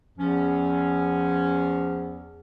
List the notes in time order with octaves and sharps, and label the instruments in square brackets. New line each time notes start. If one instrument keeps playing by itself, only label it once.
[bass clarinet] E2 [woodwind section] F3 C#4